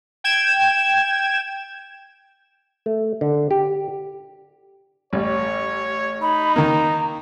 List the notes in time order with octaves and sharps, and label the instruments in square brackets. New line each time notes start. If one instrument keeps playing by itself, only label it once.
[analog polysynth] G5 G#6 E7
[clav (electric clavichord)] A3
D3
G4
[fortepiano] A1 G3 [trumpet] C#5
[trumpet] D#4 [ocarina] B5
[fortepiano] D#3 A#3 [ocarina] A#5